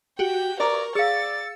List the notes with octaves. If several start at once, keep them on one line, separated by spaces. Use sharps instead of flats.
F#4 G4 G5
A#4 D5 A#5 C#6
G#4 D5 F5 E6 A6 C#7